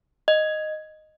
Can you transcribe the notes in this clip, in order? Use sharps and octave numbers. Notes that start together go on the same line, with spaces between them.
D#5